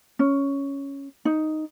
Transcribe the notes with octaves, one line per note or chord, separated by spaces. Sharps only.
C#4
D#4